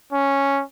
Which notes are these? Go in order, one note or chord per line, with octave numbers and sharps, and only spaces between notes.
C#4